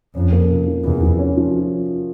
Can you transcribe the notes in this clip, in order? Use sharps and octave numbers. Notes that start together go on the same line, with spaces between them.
F2 C#4
A#3
C3
F3
E2 C3
F3
C#4
F3